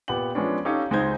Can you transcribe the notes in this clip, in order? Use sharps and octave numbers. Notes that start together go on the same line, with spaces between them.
A#2 B3 G4 F#5 G5 F#7
F3 G#3 B3 C#4 D4
C#4 D#4 G4 A4 C#5 F5
C#2 G#3 D#4 C5 G6 G#6